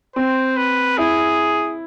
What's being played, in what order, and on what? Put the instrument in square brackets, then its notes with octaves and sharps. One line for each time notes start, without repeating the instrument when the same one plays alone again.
[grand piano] C4 [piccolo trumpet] C5
[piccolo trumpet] B4
[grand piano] E4 [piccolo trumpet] G#4